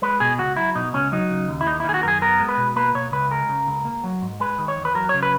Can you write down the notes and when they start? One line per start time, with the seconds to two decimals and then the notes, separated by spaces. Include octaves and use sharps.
0.02 G#3 B4
0.20 B2 G#4
0.39 C#2 F#4
0.56 F#3 E4
0.75 B2 D#4
0.93 C#2 C#4
1.12 F#3 D#4
1.30 C#3
1.48 D#2
1.61 E4
1.67 A#3 D#4
1.80 E4
1.84 D#3 G#4
1.94 F#4
2.03 F#2 G#4 A#4
2.22 B3 A#4
2.40 G#3
2.49 B4
2.57 B2
2.76 A#3 B4
2.95 B2 C#5
3.12 C#2 B4
3.31 G#3 A#4
3.49 C#3
3.67 C#2
3.85 A#3
4.04 F#3
4.22 G#2
4.40 G#3 B4
4.58 D#3
4.68 C#5
4.77 E2
4.85 B4
4.94 F#3 A#4
5.09 C#3 C#5
5.23 B4